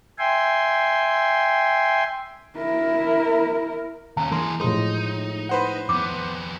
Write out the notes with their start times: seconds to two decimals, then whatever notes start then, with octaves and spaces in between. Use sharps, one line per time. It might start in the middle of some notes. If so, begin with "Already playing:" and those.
0.19 E5 G5 G#5 C6
2.58 E4 A#4
4.17 D#2 C#4 F5 A5 A#5
4.32 E3 A#3 G#4 A#4 C6
4.60 A2 F3 G#3 D#4 A#4 C6
5.49 B4 C5 F#5
5.89 F2 B3 D6